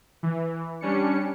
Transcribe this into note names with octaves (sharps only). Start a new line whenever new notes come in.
E3
G3 C#4 D4 C#7